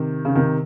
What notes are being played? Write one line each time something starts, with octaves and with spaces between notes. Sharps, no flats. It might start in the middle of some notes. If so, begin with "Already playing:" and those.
Already playing: C3 D#3
C#3
C3 D#3